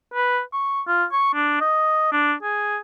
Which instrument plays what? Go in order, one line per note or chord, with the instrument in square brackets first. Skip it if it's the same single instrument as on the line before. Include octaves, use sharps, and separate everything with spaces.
[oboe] B4
C#6
F4
C#6
D4
D#5
D4
G#4